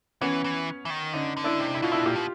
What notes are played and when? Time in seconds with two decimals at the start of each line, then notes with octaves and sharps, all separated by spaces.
0.21 E3 B3 C#4
0.44 E3
0.85 E3
0.90 D#3
1.13 D3 C#4 D#4
1.37 D3
1.44 D4 E4
1.60 C3
1.75 E4
1.82 B2 F4
1.92 D4 E4
2.06 A#2 F4 G4
2.15 B2